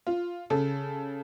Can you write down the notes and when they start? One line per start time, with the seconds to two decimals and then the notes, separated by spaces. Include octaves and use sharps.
0.07 F4
0.50 C#3 A4